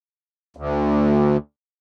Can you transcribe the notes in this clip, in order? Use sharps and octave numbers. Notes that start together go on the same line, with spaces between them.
D2